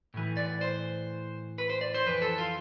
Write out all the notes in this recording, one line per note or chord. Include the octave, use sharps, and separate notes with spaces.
A2 E3
D5
C5
B4
C5
D5
C5
F2 E3 B4
A4
F4